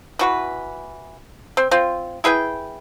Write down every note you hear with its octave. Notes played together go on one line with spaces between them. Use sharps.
E3 F#4 B4
C4
C4 F4
E4 G#4 B4 G5